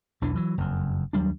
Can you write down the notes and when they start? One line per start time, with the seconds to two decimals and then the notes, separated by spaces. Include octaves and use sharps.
0.22 B1 E2 E3 D4
0.35 E3 F#3
0.58 F#1 F2
1.13 D#2 F#3 G3 D4